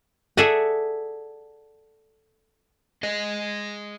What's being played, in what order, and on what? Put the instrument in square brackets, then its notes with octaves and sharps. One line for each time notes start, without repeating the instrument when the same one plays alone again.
[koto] G#4 A4 D5 E5 F#5 G#5
[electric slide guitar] G#4 D#5